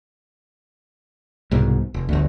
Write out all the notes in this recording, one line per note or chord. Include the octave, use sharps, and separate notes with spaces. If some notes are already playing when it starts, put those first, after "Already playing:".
C2 G#2 B2
F1
G1 D2